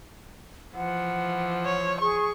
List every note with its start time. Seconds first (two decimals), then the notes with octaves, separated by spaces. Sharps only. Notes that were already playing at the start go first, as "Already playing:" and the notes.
0.74 E3 F3 F#5
1.65 C#5
2.01 G#4 C#6